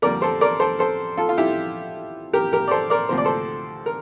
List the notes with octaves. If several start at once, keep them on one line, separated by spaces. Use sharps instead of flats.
F2 D3 G3 A#3 A#4 D5
A4 C5
A#4 D5
A4 C5
A4 C5
F4 A4
F4
E4 G4
G4 A#4
G4 A#4
D5
A4 C5
A#4 D5
D2 C3 F3 A#3 C5
D5
A4 C5
A#4